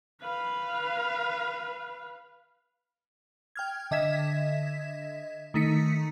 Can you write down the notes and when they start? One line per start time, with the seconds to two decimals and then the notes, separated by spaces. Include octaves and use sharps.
0.22 B4 F5
3.56 G5 F6 G#6
3.91 D3 D#5 E5 G#6 B6 E7
5.54 D#3 A3 D#4 B6 C#7